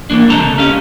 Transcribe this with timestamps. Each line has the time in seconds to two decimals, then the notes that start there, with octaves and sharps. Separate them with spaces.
0.10 G#2 E3 A#3 D4
0.29 C#2 C3 G#3 A4 A5 A#5
0.58 C#4 G4 D#5 F5